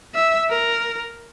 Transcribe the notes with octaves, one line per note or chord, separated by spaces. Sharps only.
E5
A#4